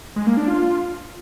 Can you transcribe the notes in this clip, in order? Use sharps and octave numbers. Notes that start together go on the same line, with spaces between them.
G#3
A#3
D4
F4